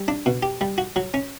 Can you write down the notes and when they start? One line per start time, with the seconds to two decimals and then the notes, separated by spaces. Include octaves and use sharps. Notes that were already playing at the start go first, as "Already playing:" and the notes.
Already playing: G3
0.08 D4
0.26 B2
0.43 G4
0.61 G3
0.78 F#4
0.96 F#3
1.14 C#4